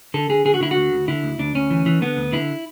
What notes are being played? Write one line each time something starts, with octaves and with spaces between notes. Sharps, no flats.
D3 A4
D3 G#4
D3 G#4
F#4
D3 E4
F#4
D2
D2
D3 E4
D2
D2 D4
D2 C#4
E3
E3
D3 B3
D2
D3 E4